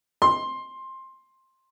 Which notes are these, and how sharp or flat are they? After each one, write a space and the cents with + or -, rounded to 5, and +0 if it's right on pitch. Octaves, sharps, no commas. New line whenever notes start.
C6 +15